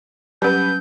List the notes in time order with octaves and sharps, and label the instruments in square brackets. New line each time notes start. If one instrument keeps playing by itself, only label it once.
[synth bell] F#3 C#4 [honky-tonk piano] G3 B4 [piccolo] G6